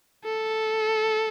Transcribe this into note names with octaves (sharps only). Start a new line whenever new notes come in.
A4